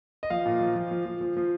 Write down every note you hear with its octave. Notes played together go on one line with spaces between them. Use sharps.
D#5
F3 F5
A#2
F3
F3
F3
F3
F3
F3